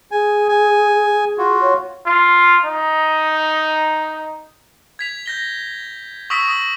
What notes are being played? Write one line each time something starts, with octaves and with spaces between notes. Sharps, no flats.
G#4 G#5
G#5
F4 F#4
C#5
F4
D#4
G#6 B6 F7
G6 A#6 G7
C#6 D#6 E6 A#6 B6 D7
D#6 A#6 F#7